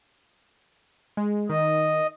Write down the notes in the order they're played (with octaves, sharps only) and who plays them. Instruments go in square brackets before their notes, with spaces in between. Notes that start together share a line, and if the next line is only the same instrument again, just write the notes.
[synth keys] G#3
[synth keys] D#3 [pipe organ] D#5